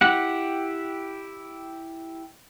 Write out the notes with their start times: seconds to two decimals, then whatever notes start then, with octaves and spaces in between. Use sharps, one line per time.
0.01 E4 G4 F#5